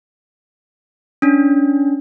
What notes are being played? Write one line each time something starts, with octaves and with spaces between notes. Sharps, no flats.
C#4 D4